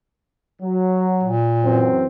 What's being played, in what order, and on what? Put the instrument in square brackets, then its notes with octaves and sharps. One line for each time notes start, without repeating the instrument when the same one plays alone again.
[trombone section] F#3
[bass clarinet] A#2
[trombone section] F#2 E3 C4